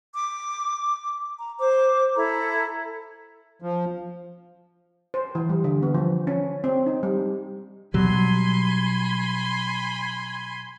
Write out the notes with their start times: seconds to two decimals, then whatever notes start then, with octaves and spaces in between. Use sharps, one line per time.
0.14 D6
1.39 A#5
1.59 C5 D6
2.15 E4 A4 A#5
3.62 F3
5.14 C5
5.35 E3
5.49 G3
5.64 D3
5.83 B3
5.94 F3
6.27 C#4
6.64 C4
6.86 D#4
7.03 G3
7.94 B2 F#3 G3 G#5 B5 C6